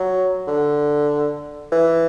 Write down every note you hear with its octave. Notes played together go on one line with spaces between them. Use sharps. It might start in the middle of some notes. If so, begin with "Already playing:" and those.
Already playing: F#3
D3
E3